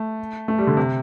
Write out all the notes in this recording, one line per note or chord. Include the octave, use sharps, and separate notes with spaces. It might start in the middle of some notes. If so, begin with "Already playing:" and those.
Already playing: A3
A3
G3
D3
C3